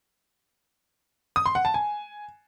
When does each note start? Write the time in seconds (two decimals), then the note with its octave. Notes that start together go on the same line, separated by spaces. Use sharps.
1.36 D#6
1.46 C6
1.55 F#5
1.65 A5
1.74 G#5